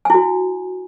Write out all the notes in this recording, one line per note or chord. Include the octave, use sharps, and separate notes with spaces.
E4 F#4 G#5